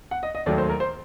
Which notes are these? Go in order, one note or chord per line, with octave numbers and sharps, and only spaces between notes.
F#5
D#5
D#5
D#2 D#3 F#3 A3 D5
C5
A#4
C5